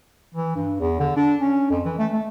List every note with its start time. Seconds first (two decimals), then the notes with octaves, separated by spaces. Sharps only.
0.35 E3
0.56 G2
0.80 E2
1.00 D3
1.16 D4
1.41 C#4
1.71 F2
1.85 E3
1.99 A3
2.13 A3